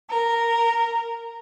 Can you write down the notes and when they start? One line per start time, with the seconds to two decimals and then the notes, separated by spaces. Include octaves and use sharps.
0.10 A#4